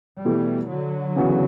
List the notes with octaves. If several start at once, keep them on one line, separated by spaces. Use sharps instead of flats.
B2 E3 G3 A3 E4 G4
D3 F#3
C#3 E3 B3 F#4